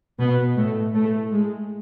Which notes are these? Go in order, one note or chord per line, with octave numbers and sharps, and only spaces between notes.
B2 B3
A2 A3
A2 A3
G#3